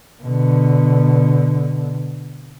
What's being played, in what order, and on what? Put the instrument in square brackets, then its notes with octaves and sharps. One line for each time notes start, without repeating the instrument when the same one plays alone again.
[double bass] B2 D3